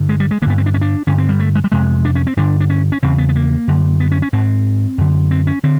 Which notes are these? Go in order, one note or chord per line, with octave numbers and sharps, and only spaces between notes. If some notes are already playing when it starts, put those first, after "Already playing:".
Already playing: G2 D3
G#3
G3
G#3
G2 D3 A#3 B3
C4
D4
C#4
D4
G2 D3 C#4
C4
G3
A3
G#3
G3
F2 C3 G#3
D4
C#4
C4
G2 D3 D4
D4
C#4
C#4
E2 C#3 C4
B3
B3
A#3
F#2 D3
B3
C#4
C#4
G#2 C4
F#2 D3
C4
C#4
D3 C4